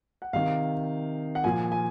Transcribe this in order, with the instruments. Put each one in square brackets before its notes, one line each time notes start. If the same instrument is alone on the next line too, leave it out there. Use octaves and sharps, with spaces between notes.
[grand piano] F#5
C3 D#3 F5
F#5
A#2 F3 G#5
G#5